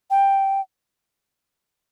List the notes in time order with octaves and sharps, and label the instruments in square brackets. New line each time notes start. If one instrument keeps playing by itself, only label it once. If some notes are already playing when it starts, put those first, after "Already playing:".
[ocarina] G5